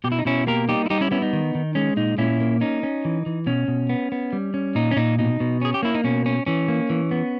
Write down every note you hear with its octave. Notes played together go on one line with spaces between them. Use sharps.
B2 G4
E4
D#4
B2 C#4 E4
A#3 G4 A#4
G3 D#4 G4
E4
G3 D#4 G4
C#4 E4
B3 C#4 E4
D#4
D#3
D#3
G#3 C#4
A#2 D#4
A#2 C#4 E4
A#3
C#4 D#4
C#4
E3
E3
B2 C#4
B2
B3
B3
G3
C#4
A#2 D#4
C#4
A#2 D#4
B2 D#4
B2
C#4 G#4
G4
A#3 E4
D#4
B2 C#4
C#4
E3 C#4
A#3
E3
B3